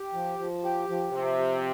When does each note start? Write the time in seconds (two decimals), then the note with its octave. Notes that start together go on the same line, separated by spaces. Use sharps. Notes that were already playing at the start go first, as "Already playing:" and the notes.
Already playing: G4
0.13 F3
0.39 F3
0.64 G4
0.89 F3
1.13 C3 F3
1.38 G4